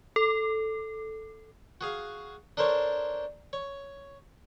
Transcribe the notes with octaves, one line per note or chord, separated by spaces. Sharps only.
A4
F#4 G#4 F5
D4 A4 A#4 C5 C#5
C#5